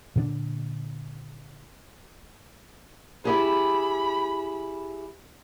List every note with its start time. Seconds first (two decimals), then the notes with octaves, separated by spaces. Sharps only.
0.16 A#2 D3 C4 D4
3.25 E4 G4 G#4 B5